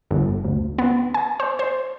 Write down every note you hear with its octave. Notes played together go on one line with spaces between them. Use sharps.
G1
D2
B3
G#5
C5
C5